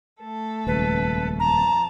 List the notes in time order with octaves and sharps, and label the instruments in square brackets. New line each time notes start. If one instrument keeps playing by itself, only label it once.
[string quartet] A3 A4
[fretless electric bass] D#1 C#2 [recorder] B4
[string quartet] F2 A5 [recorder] A#5